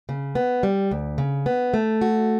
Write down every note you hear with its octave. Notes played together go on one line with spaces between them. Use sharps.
C#3
B3
G3
D2
C#3
B3
A3
F#4